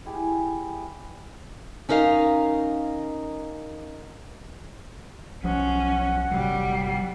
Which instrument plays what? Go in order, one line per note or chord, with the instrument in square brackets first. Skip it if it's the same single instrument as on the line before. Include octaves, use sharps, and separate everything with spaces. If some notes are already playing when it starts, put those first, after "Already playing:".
[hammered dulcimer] E4 G4 G#4
[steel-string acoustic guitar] C#4 D#4 A#4 D#5 F5
[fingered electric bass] B1 F3 [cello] C#4 [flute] F#5
[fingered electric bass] G1 C3 F#3 [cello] G3